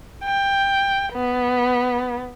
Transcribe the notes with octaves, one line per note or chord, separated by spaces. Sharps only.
G5
B3